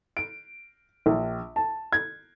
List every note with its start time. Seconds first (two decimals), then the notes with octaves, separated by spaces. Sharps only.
0.17 D7
1.06 A#1
1.56 A5
1.92 G#6